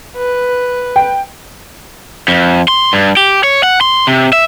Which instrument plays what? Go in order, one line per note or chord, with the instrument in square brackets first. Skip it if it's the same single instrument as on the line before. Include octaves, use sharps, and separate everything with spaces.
[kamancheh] B4
[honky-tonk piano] G5
[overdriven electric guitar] F2
C6
G2
G4
C#5
F#5
C6
C3
E5